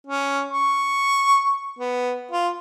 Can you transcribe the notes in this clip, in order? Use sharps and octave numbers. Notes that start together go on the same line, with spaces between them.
C#4
C#6
B3
F4